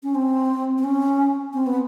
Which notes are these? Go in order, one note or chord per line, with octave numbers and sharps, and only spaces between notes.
C#4
C4
C4
C#4
C4
B3